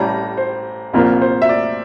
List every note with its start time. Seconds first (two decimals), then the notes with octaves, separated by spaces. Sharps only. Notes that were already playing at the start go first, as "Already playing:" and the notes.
Already playing: A1 A2 G3 A#5
0.37 C5
0.93 C2 A#2 F3 A#4
1.21 C5
1.42 E5
1.49 D5